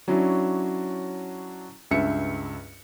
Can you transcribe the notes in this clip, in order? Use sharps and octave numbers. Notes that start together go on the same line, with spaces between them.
F#3 C#4 D4 E4 F#4
C#2 G2 E5 C#7